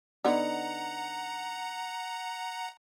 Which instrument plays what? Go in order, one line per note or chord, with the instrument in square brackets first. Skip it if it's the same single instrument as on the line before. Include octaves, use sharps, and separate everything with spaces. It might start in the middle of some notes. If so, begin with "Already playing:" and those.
[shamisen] D3 B3 D#4 [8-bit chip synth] F#5 A#5